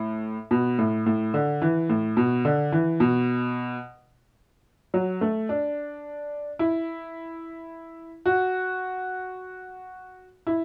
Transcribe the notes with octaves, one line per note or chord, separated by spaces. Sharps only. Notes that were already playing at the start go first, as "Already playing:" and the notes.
Already playing: A2
B2
A2
A2
D3
E3
A2
B2
D3
E3
B2
F#3
A3
D4
E4
F#4
E4